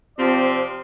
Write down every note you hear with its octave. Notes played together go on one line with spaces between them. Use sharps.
C3 F3 C4 F4 D5